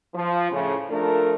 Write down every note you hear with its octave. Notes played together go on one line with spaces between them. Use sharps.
F3
A2 C#3
F3 A3 D4 A#4